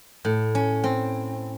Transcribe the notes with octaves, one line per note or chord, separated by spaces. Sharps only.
A2
C#4
C4